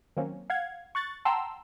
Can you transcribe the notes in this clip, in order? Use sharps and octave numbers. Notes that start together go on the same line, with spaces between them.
D#3 F#3 A#3 C4 C#4
F5 F#5 G#6
C#6 F#6 A6
F#5 G5 A5 A#5 C6 E6